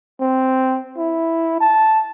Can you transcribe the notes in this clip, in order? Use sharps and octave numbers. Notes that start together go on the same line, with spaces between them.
C4
E4
A5